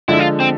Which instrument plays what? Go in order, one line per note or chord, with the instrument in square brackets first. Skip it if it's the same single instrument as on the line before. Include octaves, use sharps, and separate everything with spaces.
[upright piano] D3 F3 G#3 [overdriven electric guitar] E4
[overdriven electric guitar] F4
C4